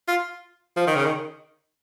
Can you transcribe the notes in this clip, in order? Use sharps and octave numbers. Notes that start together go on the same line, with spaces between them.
F4
F3
D#3
C#3
D#3